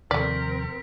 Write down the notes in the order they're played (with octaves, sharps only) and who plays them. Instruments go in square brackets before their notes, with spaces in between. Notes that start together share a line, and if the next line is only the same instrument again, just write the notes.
[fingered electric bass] D#2 C3 F3 [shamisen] A3 D5 [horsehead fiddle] C4 A#4 [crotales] B6